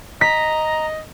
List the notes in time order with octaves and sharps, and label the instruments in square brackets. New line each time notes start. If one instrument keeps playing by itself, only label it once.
[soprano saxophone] D#5 [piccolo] A#5 [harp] B6